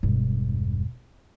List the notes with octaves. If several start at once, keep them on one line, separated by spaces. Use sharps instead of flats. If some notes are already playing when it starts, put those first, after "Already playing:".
E1 G2